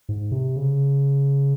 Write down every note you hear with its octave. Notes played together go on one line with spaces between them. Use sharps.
G#2
C3
C#3